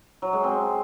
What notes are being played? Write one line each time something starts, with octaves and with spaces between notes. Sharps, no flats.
F#3
G#3
C4